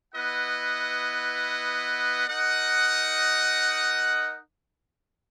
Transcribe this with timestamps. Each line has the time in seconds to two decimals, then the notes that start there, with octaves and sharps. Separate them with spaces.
0.15 B3 E4 B4 D#5 F#5
2.27 D#4 A#4 D#5 F#5